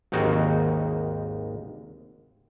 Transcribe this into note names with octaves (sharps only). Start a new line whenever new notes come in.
G#1 D#2 D#4 F#4